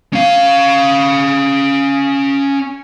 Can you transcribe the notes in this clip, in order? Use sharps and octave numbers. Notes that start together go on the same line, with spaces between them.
C#4 F5